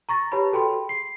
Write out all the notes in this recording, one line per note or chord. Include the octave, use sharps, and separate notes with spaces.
A#5 C#6 A6 A#6
G4 B4 C#5 A5 B5
F#4 G#4 A4 G5 B5 C6
C7